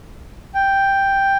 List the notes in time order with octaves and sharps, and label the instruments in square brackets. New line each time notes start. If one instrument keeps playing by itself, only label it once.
[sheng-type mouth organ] G5